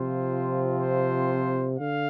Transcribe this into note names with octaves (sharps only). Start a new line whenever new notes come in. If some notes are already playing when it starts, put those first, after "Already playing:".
Already playing: C3 F3 C4 F4 C5
C5
D3 F5